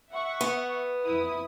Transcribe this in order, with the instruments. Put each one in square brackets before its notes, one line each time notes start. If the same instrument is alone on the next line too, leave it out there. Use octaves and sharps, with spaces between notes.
[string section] E5 F#5 C#6
[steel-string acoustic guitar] B3
[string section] F2 E4 D#6